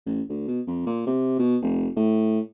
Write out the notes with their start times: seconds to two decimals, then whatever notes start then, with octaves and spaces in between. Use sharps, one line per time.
0.06 A1
0.29 D2
0.48 B2
0.67 F2
0.86 A#2
1.07 C3
1.39 B2
1.62 F1
1.96 A2